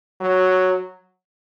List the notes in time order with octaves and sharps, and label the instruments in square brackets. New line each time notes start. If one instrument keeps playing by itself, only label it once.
[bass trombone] F#3